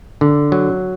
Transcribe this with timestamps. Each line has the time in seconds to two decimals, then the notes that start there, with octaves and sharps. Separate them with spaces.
0.21 D3
0.52 F#3